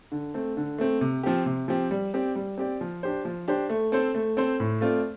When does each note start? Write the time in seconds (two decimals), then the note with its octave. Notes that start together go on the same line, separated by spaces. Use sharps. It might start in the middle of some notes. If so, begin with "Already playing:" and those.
0.12 D3
0.34 A3 C4
0.57 D3
0.78 A3 C4
1.01 C3
1.23 F3 C4 G4
1.46 C3
1.68 F3 C4 G4
1.91 G3
2.14 C4 G4 D5
2.36 G3
2.58 C4 G4 D5
2.81 F3
3.03 D4 G4 C5
3.25 F3
3.48 D4 G4 C5
3.69 A3
3.92 C4 A4 C5
4.15 A3
4.37 C4 A4 C5
4.60 A2
4.81 A3 C4 F4 D5